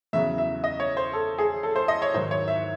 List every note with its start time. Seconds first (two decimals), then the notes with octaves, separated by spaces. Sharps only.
0.13 E2 C#3 F#3 E5
0.38 E5
0.64 D#5
0.80 C#5
0.97 C5
1.13 A4
1.38 G#4
1.63 A4
1.76 C5
1.88 D#5
2.02 C#5
2.14 G#2 D#3 F#3 C5
2.31 C#5
2.48 E5